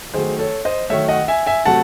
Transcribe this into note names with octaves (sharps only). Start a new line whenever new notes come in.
D#3 F#3 A3 G#4 C5
A4 C#5
C5 D#5
D#3 F#3 A3 C#5 E5
D#5 F#5
E5 G#5
E5 G#5
C3 F#3 A3 F#5 A5